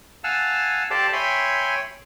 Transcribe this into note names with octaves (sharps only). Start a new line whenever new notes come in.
F5 F#5 G#5 A5 E6 F6
G4 A4 C5 D5 F5 A5
C#5 E5 G5 G#5 B5 C6